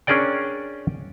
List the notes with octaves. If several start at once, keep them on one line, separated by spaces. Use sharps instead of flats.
C#4 D4 G#4 A#4 D5 G5